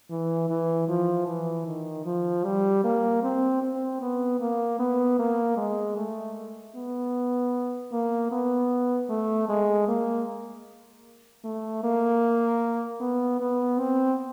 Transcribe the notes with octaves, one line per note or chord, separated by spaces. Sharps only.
E3
E3
F3
E3
D#3
F3
G3
A#3
C4
C4
B3
A#3
B3
A#3
G#3
A3
B3
A#3
B3
A3
G#3
A#3
A3
A#3
B3
B3
C4